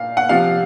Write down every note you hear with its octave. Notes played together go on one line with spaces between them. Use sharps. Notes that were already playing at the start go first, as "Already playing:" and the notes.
Already playing: A#2 F5
F#5
C3 F3 F5